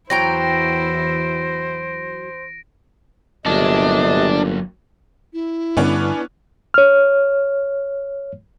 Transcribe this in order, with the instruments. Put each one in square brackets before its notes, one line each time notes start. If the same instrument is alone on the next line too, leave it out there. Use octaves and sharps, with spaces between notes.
[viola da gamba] E2 E4 [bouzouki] F#3 G5 A#5 [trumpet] C5 [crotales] A#6 D7
[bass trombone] G1 [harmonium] C3 D#5 [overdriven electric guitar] F#3 A#3 [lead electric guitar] D4
[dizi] E4
[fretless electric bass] G2 D3 [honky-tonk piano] B3 C#4 D4
[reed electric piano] C#5 F6